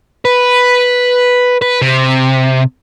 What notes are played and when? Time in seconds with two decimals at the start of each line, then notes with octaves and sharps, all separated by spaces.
0.25 B4
1.62 B4
1.81 C3